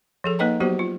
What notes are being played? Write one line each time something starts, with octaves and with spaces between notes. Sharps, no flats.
F3 G#4 A4
A#3 D#4 B4 D#5 G5 A#5
F#3 B3 F#4 G4 C5
F4